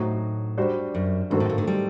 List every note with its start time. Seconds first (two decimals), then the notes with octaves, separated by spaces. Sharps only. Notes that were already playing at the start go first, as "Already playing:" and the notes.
Already playing: A2 F#3 A3 D#4 F#4 C5
0.57 G3 D4 F#4 C5
0.95 F#2
1.30 G2 D#3 A3 C4 F#4 A4
1.40 A2
1.50 A#2
1.58 D3
1.67 G3